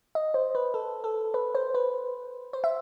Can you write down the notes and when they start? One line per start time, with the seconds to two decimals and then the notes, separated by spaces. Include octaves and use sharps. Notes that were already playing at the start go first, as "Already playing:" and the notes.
0.15 D#5
0.34 C5
0.55 B4
0.74 A4
1.04 A4
1.34 B4
1.55 C5
1.75 B4
2.53 C5
2.64 E5